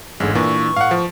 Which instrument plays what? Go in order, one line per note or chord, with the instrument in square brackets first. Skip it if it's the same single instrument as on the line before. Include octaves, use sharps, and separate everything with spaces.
[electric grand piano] A1 [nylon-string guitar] E2 G#2 D3 [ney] G#4
[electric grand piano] A#2 [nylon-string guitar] E3 D4 [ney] C#6
[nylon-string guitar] A2 [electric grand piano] F5 F#5
[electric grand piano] F3